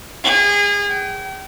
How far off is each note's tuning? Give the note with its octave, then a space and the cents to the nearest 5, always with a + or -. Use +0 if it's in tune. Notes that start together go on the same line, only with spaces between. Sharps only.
G#4 -30
G5 -35